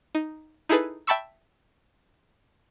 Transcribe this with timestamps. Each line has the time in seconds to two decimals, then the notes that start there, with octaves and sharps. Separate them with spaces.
0.15 D#4
0.69 D#4 E4 G#4 A4 B4
1.07 E5 G5 A5 B5 C#6 E6